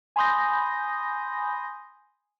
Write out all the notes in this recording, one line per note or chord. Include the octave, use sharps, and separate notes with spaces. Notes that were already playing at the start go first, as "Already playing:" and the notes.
G#5 B5 C6 D#6 G6 A#6